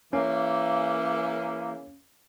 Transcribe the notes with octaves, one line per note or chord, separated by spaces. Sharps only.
C#3 E3 A#3 C#4